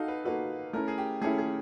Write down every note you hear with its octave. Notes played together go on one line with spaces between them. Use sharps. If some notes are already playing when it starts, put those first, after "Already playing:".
Already playing: D#4 F#4 A4 F5 F#5
B4
A#3 D#4 F#4 A4 B4
A3 C#4 E4 A#4
G#4
G4
A3 C#4 E4 G#4
G#4